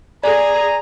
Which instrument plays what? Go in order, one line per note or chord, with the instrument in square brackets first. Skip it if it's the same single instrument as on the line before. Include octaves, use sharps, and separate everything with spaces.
[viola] G#4 [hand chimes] D5 [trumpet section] G#5 A#5